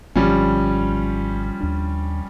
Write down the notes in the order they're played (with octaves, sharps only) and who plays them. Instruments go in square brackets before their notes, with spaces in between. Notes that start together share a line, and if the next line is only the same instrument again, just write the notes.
[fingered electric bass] G#1 D3 [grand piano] F3 G3 C#4
[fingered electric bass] D#2 D4